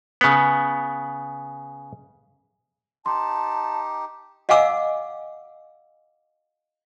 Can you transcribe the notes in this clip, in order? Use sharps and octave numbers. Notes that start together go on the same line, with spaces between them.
C#3 B3
D#4 G4 A5 C6
D#5 F5 F#5 G#5 D6 E6